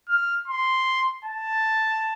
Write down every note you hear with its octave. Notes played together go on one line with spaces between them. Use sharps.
F6
C6
A5